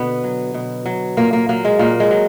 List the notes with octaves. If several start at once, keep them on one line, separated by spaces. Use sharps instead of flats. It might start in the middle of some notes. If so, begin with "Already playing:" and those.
Already playing: B2 D3 B3
F#3
B2
F#3
A#2 A#3
A#3
F#3 A#3
G#3
A#2 A#3
G#3
F#3